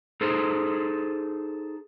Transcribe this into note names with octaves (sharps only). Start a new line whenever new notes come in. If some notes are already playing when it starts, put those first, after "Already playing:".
D#4 G#4 A4 C5